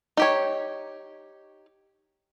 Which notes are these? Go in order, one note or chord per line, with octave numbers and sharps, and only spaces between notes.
D#4 G4 C#5